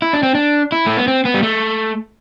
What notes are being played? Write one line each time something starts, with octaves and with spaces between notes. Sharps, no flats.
E4
D4
C4
D4
E4
A3
B3
C4
B3
G3
A3